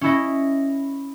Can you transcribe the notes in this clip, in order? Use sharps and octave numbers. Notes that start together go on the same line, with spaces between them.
C#4 E4 D#5